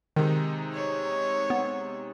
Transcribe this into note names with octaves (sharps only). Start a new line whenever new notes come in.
C3 D#3 G#3 D#4
C#5
B3